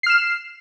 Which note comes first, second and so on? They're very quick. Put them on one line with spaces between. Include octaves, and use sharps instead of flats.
C7 F6 E7